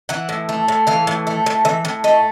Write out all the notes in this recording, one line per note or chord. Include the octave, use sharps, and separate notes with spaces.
E3 F#5
A2
A3
A2
E3 F5
A2
A3
A2
E3 E5
A2
A3 D#5